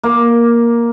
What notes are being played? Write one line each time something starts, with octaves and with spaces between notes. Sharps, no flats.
A#3